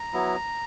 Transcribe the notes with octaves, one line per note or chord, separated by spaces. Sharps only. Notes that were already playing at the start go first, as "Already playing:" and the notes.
Already playing: A#5
F#3 B3 E4